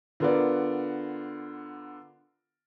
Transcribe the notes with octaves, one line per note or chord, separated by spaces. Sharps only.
D3 B3 F4 A#4 B4 D5